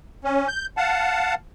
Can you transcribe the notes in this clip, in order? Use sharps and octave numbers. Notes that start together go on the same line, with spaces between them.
C#4
G6
F5 F#5 A5